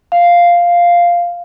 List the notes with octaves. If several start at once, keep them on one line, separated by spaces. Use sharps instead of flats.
F5